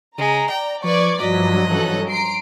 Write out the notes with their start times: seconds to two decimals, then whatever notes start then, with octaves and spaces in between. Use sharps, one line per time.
0.18 C#3 G#3 A#5
0.50 D5 G5
0.84 F3 B4 D5 C#6 G#6
1.20 G2 F3 F#3 D5 D#5 B6
1.68 E3 C#4 A4 F#6
2.08 A#5 C6 C7 D7